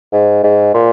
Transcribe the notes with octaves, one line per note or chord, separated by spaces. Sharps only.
G#2
G#2
A#2